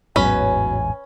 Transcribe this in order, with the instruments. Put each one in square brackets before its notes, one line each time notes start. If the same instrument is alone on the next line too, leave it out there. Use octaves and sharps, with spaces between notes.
[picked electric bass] A1 E2 G#2 [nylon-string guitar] F#3 B3 [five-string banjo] C#4 B4 [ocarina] G#5